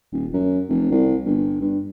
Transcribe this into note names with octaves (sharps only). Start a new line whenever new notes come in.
D#1
F#2
F1
C2
G1
G2